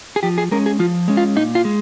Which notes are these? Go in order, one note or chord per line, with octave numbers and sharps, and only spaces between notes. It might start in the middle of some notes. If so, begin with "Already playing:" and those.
G#4
F3 G4
G#4
G#3 C#4 A#4
G#4
F3 F4
G#3 C#4
F4
A#2 D#4
F4
G#3